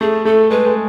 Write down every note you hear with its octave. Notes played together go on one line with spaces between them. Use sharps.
A3 G#4
A3 A4
G#3 B4
G#3